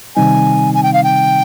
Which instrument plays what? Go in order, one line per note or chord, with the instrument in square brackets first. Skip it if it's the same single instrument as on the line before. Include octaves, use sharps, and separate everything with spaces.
[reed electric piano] C3 D#3 G3 C4 D#4 [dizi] G#5
[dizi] G#5
G5
F5
G5